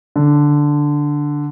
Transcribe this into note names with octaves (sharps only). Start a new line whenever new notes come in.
D3